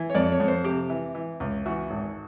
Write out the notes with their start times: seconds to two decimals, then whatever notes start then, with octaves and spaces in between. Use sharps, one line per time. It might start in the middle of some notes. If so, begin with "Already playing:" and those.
Already playing: E3
0.10 C#5
0.15 F2 D5
0.32 C#5
0.40 F2
0.48 C5
0.65 C3 G4
0.90 E3
1.15 E3
1.40 C#2
1.66 E3 F#4
1.90 G#1